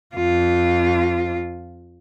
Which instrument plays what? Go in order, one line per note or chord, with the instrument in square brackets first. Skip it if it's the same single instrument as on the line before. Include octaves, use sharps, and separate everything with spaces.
[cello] F2 F4